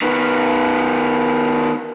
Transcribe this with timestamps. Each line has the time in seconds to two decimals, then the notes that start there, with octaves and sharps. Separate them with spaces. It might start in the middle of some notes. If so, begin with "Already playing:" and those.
0.02 D#3 B3